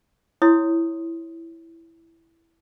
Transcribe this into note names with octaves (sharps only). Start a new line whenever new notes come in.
E4 C#5 C6 D#6